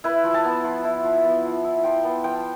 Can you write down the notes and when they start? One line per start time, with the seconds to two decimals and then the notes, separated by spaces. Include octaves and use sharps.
0.04 E4 B4
0.24 F3
0.34 A5
0.44 B3
0.64 F3
0.84 E4
1.04 F3
1.25 B3
1.45 F3
1.64 E4
1.84 F3 G5
2.04 B3 A5
2.24 F3 G5